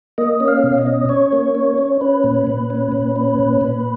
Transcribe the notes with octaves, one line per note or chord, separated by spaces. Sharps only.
A#3 D#5
C#4
F5
B2
D#5
C#4
C#4 C#5
A#3
C#4
C#4
C#4 B4
A#2
A#2
C#4
A#2
C#4
A#2
A#2